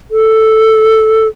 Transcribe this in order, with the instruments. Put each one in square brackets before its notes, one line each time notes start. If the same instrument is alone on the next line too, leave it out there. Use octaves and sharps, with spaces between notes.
[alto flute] A4